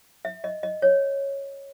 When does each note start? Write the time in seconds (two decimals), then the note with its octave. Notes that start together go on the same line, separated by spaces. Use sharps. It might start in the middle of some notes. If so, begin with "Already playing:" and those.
0.25 E5
0.44 D#5
0.63 D#5
0.82 C#5